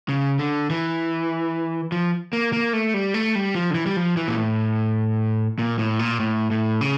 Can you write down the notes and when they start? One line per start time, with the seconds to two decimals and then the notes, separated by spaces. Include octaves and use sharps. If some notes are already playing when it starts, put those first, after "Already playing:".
0.09 C#3
0.39 D3
0.70 E3
1.92 F3
2.33 A#3
2.53 A#3
2.73 A3
2.94 G3
3.14 A3
3.35 G3
3.56 F3
3.71 D3
3.75 E3
3.86 G3
3.96 F3
4.17 E3
4.28 A#2
4.37 A2
5.59 A#2
5.79 A2
5.99 A#2
6.20 A2
6.51 A2
6.81 C#3